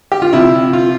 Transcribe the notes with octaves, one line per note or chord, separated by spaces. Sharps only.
G4
F4
C3 F3 E4
F4